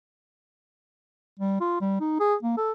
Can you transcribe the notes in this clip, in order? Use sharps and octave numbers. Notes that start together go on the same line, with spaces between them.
G3
F4
G3
D#4
G#4
A#3
A4